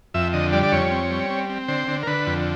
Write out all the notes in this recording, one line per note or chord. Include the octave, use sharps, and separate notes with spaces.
F2 E5
D3 D#5
G3 D5
D5
F2 C#5
C4
G3
C4
C4
D3 C5
D3
A#4
D3 B4
F2